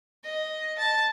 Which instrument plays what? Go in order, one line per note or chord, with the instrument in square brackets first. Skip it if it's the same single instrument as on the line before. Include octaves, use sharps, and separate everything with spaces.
[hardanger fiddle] D#5
A5